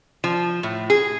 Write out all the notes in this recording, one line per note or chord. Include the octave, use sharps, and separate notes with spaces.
F3
A2
G#4